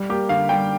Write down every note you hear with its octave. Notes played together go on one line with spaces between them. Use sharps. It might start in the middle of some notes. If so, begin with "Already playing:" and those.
Already playing: G3
A#3 G4
D3 F5
G3 G5